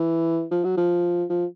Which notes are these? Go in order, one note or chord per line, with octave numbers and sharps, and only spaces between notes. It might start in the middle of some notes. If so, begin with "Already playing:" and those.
Already playing: E3
F3
F#3
F3
F3